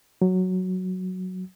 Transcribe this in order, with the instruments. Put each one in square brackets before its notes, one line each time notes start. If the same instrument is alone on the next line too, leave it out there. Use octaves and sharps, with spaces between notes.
[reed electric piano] F#3